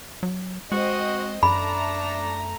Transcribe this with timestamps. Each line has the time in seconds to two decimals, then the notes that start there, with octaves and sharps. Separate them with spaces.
0.23 F#3
0.72 G#3 C4 F#4 C5 D#5
1.43 F#2 A3 D4 A#5 B5